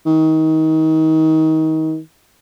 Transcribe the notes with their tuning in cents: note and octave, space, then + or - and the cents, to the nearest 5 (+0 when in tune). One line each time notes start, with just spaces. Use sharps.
D#3 +30